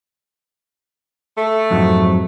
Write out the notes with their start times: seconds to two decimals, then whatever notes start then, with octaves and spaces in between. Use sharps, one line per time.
1.36 A3
1.71 F2 G#2 F#3